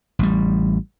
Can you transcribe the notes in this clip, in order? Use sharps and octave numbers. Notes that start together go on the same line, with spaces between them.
A1 G3